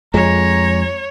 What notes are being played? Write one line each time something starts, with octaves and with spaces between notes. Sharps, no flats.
F2 G#3 C#5 A#5